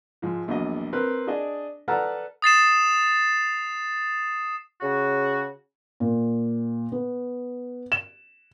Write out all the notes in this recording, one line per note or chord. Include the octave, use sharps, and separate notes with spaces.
G#2 F3
A#1 E2 F#3 D#5
C4 A#4 B4
D4 G#4 D5 D#5
A4 B4 D5 F#5 A#5 F6
D#6 A6 C7 E7
C#3 F#4
A#2
B3
E7